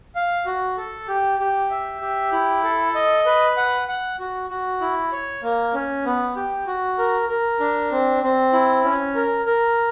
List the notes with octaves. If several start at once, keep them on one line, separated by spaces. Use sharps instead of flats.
F5
F#4
A4
G4
G4
E5
G4
E4
A4
D#5
B4
F#5
F#5
F#4
F#4
E4
C#5
A#3
C#4
B3
G4
F#4
A#4
A#4
D4
C4
C4
E4
C#4
A#4
A#4